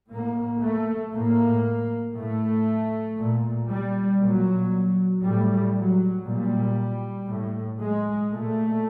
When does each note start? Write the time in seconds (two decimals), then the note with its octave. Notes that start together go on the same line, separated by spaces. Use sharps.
0.11 A2 A#3
0.62 A3
1.13 A2 A#3
2.16 A2 A3
3.18 A#2
3.70 G3
4.21 A#2 F#3
5.24 A2 G3
5.76 F#3
6.26 A#2 G3
7.29 A2
7.81 G#3
8.31 A#2 A3